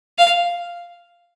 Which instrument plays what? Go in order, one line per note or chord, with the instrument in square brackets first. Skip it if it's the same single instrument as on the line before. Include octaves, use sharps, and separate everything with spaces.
[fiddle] F5